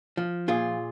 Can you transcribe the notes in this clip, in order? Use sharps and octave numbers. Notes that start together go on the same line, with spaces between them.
F3
A#2 F4 G#4